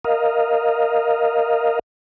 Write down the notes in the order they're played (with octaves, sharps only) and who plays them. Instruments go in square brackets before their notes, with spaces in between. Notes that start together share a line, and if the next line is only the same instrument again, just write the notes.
[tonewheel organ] A#4 D#5 F5